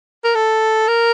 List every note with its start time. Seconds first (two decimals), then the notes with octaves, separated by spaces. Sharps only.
0.24 A#4
0.35 A4
0.88 A#4